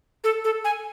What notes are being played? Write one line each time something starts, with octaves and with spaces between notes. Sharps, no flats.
A4
A4
G#5